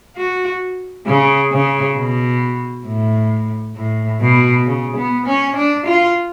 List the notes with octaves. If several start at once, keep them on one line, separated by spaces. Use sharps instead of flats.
F#4
C#3
C#3
B2
A2
A2
B2
C#3
B3
C#4
D4
F4